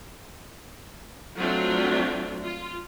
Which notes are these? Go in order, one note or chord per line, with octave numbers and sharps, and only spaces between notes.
F#3 A3 C4 D4 F4
F4